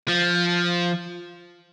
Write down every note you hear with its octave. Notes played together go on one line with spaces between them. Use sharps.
F3